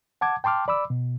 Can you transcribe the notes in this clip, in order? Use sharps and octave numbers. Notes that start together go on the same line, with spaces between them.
F#5 A5 D6 G#6
G5 A5 C6 D6 F6
D5 B5 D6 E6
B2